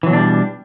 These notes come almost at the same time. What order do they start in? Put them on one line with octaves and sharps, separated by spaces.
E3 F#3 B2 D4 G3